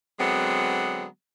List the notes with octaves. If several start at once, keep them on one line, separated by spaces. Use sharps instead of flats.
D3 F#3 G#3 B3 C4